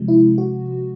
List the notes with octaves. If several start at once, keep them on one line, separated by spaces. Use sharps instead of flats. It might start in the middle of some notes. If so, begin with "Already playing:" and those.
Already playing: C3 F3 G#3
E4
F#4